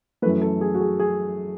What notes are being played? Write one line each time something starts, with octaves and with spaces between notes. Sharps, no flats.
F#2 E3 A3 B4
A4
G#4
F#4
G#4
G#4